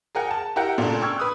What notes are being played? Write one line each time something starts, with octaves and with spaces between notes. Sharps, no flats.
G#4 A#4 F#5 G5
A5
E4 G4 A#4 F#5 G5
A#2 C#3 A3 A#3 D4
G5 C#6 E6 F6 G#6
B4 D#6 F#6